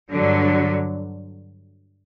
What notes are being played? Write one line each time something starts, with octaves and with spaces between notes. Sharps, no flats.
G2 D3 F#3